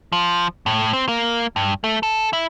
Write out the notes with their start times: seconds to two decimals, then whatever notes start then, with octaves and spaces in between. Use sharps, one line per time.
0.12 F3
0.66 A2
0.93 C4
1.08 A#3
1.56 G2
1.84 A3
2.03 A4
2.33 E4